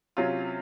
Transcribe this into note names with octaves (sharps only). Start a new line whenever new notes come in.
C3 F#3 C#4 F4